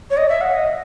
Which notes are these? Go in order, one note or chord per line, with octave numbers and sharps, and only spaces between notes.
C#5
D#5
E5
F#5
D#5